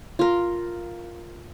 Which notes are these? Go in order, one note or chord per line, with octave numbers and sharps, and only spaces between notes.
F4 A#4